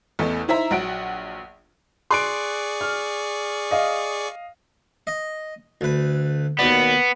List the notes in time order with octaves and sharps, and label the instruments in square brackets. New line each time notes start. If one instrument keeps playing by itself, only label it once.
[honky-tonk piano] A1 E2 A3
D#4 E4 C5 E5 A#5
A#1 F#3 F#5 D7
[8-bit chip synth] G#4 D5 C#6 [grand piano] C6 F#6 D7
[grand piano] F6
D#5 F5
[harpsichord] D#5
D2 B4
[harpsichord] D#2 B2 D5 [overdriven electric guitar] B3